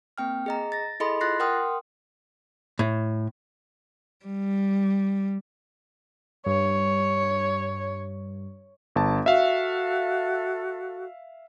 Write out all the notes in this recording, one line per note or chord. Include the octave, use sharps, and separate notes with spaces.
A#3 C4 G5 F6
G#4 D#5 A#5
A6 A#6
E4 G#4 A4 D#5 B5 C6
F4 C6 F#6 A6 A#6 C7
A#4 F#5 G5 C6 D#6 F6
A2
G3
G2 C#5
G1 A5
F#4 A4 E5 F5